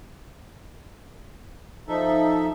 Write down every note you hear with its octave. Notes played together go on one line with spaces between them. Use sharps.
F3 D#4 A4 E5